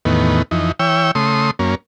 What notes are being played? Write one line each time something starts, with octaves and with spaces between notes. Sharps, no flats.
E2 A2 D#3 B3
F2 E3 D#4
E3 C#5 G5 E6
C#3 A3 C6 D#6
F#2 A#3 C#4